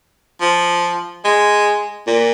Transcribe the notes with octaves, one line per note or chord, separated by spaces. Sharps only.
F3
G#3
A#2